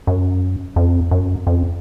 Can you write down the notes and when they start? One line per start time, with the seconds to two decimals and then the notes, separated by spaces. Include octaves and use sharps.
0.07 F#2
0.76 F2
1.11 F#2
1.47 F2